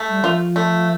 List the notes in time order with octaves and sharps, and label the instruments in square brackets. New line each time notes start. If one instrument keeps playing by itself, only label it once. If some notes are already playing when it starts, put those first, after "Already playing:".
Already playing: [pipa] A3
[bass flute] G3
[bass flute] F3 [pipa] F4
[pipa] A3